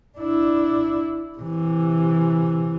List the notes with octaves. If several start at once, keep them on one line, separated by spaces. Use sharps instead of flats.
D4 E4
C3 E3